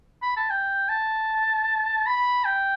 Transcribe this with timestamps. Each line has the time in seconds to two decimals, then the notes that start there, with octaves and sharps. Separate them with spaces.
0.22 B5
0.37 A5
0.50 G5
0.89 A5
2.06 B5
2.45 G5